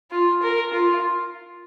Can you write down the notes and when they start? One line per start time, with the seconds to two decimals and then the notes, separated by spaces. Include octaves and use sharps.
0.11 F4
0.42 A#4
0.73 F4